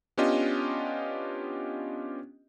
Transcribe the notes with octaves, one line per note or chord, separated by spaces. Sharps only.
B3 C#4 D4 F4 G4 D#5